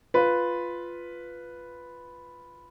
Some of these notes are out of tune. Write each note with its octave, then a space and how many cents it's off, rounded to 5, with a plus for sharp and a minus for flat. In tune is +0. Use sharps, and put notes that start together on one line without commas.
F4 +0 B4 +0